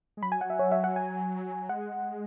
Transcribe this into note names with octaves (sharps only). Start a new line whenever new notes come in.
G#3
F#3 B5
G#5
F#5
E5
C#5
E5
F#5
G#5
G#3 F#5